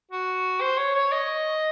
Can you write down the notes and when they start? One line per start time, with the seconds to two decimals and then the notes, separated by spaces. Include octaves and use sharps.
0.11 F#4
0.61 C5
0.78 C#5
0.95 C#5
1.12 D#5